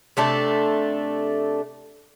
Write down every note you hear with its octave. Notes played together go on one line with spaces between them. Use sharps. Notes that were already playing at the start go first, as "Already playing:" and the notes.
C3 A3 D4